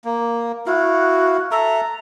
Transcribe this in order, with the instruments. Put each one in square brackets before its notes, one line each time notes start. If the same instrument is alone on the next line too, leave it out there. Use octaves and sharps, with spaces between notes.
[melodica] A#3
[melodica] E4 F5 [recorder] F#4
[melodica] A4 E5 [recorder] A#5